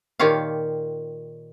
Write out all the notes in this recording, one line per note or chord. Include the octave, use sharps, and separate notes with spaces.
A#2 D#3 F4 G4 C#5 F5